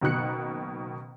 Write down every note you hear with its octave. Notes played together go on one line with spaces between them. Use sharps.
F#1 B2 D#3 F#6 C#7